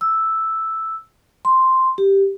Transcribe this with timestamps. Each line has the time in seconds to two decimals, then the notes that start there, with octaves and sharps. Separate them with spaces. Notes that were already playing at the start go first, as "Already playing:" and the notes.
0.01 E6
1.45 C6
1.98 G4